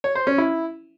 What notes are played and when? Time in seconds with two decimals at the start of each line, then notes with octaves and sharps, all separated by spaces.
0.04 C#5
0.15 C5
0.27 C#4
0.38 E4